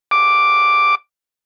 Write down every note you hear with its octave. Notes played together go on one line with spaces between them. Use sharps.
D6